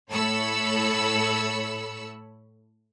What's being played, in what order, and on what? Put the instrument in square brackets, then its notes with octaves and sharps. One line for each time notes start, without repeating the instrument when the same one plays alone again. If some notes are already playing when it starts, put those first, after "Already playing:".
[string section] A2 A4 C#5 B5 E6 C#7